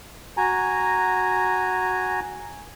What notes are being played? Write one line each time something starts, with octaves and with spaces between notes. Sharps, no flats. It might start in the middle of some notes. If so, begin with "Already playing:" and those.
F#4 G#5 A#5